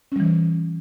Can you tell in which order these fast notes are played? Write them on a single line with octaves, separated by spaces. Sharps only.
C#4 G3 E3